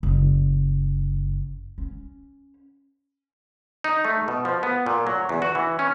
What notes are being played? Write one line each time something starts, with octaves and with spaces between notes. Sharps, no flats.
F#1
C#4
D#4
A3
B2
F3
B3
A#2
F#3
E2
F#4
E3
C#4